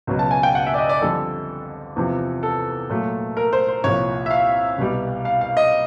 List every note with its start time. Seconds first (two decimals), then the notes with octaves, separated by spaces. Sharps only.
0.07 C#2 B2 F#3
0.19 A5
0.31 G#5
0.43 G5
0.55 F#5
0.67 E5
0.74 D5
0.78 D#5
0.89 D5
1.02 F2 D3 G3 A4
1.96 E2 C3 F3
2.43 A4
2.89 A#2 F#3 A3
3.37 A#4
3.53 C5
3.68 C5
3.84 C2 A#2 F3 C#5
4.26 E5
4.31 F5
4.78 C2 B2 G3
5.25 F5
5.41 F5
5.57 D#5